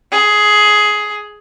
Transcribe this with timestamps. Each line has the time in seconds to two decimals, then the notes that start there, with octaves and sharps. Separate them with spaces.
0.12 G#4